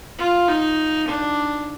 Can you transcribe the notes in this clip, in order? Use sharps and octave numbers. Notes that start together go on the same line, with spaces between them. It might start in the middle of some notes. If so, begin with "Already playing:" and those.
F4
D#4
D4